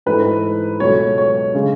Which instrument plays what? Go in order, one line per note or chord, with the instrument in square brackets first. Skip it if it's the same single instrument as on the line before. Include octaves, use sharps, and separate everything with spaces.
[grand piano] G#2 E3 A3 B4
C#2 B2 F#3 A3 C#5
C#5
C#3 G#3